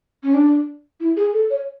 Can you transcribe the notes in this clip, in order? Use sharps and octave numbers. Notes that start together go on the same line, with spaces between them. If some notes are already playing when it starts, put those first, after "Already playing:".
C#4
D4
E4
G#4
A4
C#5